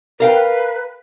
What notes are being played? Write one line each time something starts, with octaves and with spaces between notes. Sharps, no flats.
A#4 B4 F5 G5